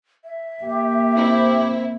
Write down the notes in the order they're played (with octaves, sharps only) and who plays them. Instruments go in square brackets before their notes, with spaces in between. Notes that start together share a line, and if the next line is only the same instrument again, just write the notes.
[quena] E5
[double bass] A#3 [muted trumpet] G4
[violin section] C4 E4